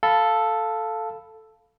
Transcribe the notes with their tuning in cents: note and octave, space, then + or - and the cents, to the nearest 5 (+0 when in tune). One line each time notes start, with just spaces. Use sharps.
A4 +0 F5 +0 B5 +0